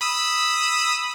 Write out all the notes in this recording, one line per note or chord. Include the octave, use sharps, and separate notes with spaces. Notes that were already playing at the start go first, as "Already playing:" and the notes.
B5 D#6 E6